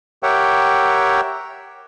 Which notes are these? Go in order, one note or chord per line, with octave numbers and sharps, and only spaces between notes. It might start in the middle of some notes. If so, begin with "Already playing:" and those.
G4 A#4 C#5 E5 F#5 G5